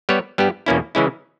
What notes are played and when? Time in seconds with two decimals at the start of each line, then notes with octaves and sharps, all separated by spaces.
0.09 G3 B3 G4 C#5
0.38 G2 G3 B3 G4
0.66 E2 B2 A#3 C#4 E4
0.95 C#3 E3 G#3 C#4 E4